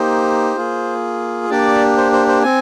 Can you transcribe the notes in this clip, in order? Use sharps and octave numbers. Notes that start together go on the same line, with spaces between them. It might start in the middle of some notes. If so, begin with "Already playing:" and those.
Already playing: A#3 D#4 G4 C5
A#3 F4 G#4
A#3 D4 G4 D5
C5
C5
C5
C4 G#5